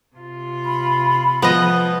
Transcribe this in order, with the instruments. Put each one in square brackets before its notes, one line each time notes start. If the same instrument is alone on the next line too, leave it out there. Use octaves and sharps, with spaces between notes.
[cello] C3 F4
[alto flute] B5
[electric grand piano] F3 [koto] B3 D#5